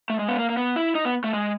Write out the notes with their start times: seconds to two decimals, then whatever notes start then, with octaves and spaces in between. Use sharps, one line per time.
0.10 A3
0.19 G#3
0.29 B3
0.39 A#3
0.50 A#3
0.57 B3
0.76 E4
0.95 D#4
1.05 B3
1.24 A3
1.33 G#3